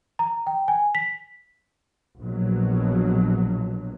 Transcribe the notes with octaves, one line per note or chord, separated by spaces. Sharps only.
A#5
G5
G#5
B6
A#1 B2 F#3